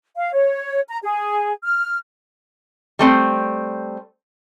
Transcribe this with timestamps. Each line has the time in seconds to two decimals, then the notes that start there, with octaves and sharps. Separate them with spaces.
0.16 F5
0.33 C#5
0.88 A#5
1.02 G#4
1.62 F6
2.99 G3 A3 C4